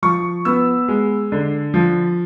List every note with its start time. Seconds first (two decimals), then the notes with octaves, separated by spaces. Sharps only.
0.03 F3 C#6
0.45 B3 E6
0.88 G#3
1.32 D3
1.74 F3